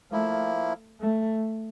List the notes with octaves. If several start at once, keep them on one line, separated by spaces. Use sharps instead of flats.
F3 A3 A#3 E4
A3